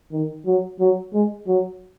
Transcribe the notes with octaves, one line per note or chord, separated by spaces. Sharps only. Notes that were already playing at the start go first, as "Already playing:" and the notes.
D#3
F#3
F#3
G#3
F#3